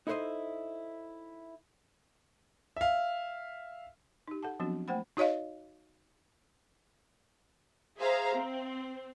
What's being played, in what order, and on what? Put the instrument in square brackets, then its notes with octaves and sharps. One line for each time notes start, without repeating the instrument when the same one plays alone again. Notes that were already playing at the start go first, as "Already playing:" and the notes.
[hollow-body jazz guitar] D#4 E4 A4 B4 C5 D#5
[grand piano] E5 F5
[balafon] D#4 G4
A4 F#5 A5
F3 F#3 B3 C4 D4 F#4
A3 A#3 C5 F#5 G5 B5
D#4 F#4 C#5 D#5 F5
[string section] G#4 C5 E5 F5 A#5
C4